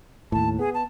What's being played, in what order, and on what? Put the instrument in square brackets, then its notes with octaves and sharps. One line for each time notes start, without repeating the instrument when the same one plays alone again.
[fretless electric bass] D#2 A2 [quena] A5
[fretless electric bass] B3 [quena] G#4
[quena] A5